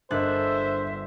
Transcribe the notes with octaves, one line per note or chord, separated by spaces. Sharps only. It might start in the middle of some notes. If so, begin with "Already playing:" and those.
G1 D4 A#4 C5 D#5 E5 F#6 A6